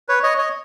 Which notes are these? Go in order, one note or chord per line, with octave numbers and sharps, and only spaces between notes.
B4 C#5
C#5 D#5
C#5 D#5